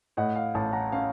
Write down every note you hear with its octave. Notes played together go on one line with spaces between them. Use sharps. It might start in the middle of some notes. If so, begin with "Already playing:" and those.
A2 D#5 F#5
F5
A1 F5 A5
F#5 A#5
C#4 F5